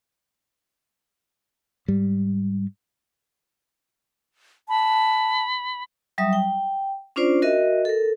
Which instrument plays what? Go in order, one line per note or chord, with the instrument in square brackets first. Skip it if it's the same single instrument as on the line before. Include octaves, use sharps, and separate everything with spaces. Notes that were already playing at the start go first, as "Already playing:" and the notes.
[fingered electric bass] G#2 G3
[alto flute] A5 [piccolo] B5
[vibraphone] F#3 G3 E5 D#6
G5
C#4 D4 F4 C5 D5
F#4 A#4 D#5 E5
A4 A#4